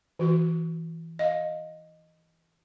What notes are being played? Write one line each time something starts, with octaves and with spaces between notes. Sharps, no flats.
E3 F#4
D#5 F5